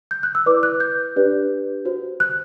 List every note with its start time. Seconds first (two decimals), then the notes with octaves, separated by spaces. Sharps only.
0.11 G6
0.23 F#6
0.35 E6
0.46 E4 B4 D5 D6
0.63 F#6
0.80 G6
1.16 D4 G4 B4 D5
1.85 F#4 C5
2.20 F#6